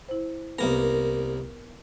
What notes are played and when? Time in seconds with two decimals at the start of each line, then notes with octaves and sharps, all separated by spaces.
0.09 E4 C5
0.59 C2 A#3 B3 A#4 B4 A#5
0.77 A#4